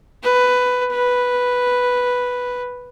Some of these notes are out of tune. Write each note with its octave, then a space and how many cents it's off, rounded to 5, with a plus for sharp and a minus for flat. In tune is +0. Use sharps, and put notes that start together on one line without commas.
B4 +10
B4 +0